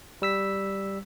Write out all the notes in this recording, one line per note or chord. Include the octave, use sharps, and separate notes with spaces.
G3 E6 B6